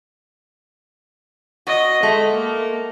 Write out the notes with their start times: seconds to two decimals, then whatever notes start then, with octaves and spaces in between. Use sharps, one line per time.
1.67 F#4 D#5
2.03 G#3 A3
2.33 A#3